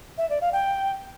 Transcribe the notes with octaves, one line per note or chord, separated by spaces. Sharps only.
E5
D5
F5
G5